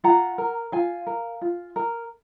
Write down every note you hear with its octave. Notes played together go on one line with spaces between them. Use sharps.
F4 F#5 A#5
A#4
F4 F5 G#5
A#4
F4
A#4